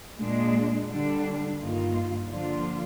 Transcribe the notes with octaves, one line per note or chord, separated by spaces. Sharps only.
A#2 G#3 D4
D3 G3 D4
G2 D#3 A#3 F4
D3 F3 A#3 D4 F4